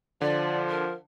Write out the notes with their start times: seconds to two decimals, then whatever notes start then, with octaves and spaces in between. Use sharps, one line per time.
0.21 D3 F3 D5
0.69 A#4